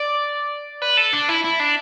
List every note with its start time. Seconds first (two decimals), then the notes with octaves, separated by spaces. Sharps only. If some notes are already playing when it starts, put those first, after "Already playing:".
Already playing: D5
0.82 B4
0.97 A4
1.13 D4
1.29 E4
1.44 E4
1.60 D4